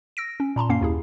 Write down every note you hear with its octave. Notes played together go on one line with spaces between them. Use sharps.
E6 A#6 D7
C#4
A#2 A5 A#5 C6
F#2 A#3 C#4 F5 C7
D#2 E4 G#4